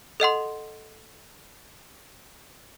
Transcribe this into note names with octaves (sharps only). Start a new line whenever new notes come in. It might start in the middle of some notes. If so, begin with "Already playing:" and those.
A4 D#5 F#5 C6